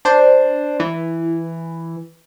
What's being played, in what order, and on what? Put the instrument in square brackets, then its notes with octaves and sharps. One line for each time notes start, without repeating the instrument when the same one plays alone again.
[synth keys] D4 C5
E3